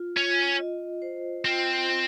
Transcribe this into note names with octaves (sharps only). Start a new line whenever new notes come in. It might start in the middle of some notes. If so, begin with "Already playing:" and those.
Already playing: F4
C#4 F4
D#5
C5
C4 F4
F4